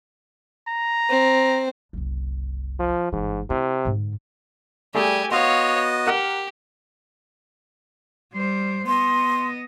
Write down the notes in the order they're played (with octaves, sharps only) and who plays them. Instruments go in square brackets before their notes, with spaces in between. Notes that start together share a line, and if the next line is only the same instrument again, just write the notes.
[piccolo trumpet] A#5
[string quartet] C4
[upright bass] F#1 C2
[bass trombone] F3
[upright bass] G1 E3 [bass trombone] G#2
[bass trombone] C3 [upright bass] E4
[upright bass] G#2 D3
[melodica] G3 [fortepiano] A3 G#4 [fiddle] G4 G#5
[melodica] B3 F#4 D#5 [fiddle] C#5 F5 [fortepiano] C6 E6
[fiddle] G4 [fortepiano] A#4 F#5
[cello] G3 C5
[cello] B3 D#5 [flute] C6